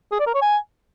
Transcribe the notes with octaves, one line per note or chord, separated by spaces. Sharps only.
G#4
D5
A#4
C#5
G#5